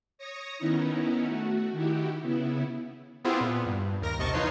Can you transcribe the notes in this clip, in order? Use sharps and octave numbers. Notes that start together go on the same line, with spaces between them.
C#5 D#6 A#6 C#7
D#3 B3 C#4 D#4 E4
A3 F#4
D#3 E4 F#4 G4
C#3 B3 E4
B3 C4 E4 F4 G4 G#4
A#2 B3
G2
D#2 A#4 A#6
A#1 C3 D#5 A5 C#6
E2 D#4 F4 B4 C#5 C7